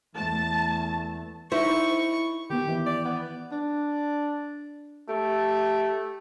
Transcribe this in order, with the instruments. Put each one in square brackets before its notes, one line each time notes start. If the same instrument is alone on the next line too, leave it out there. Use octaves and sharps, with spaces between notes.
[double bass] E2 A3 [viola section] A5
[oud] D#4 C5 [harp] E4 [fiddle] C#6
[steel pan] D#3 B3 [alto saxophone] G4
[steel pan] E3 E4
[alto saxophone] D5
B3
D4
[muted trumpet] A3 [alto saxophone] G4